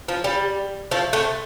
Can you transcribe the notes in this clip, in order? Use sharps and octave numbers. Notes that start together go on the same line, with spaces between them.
F3
G3
F3 A3
A3 C4